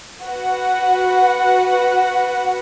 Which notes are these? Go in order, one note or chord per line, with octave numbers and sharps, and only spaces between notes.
F#4 B4 F#5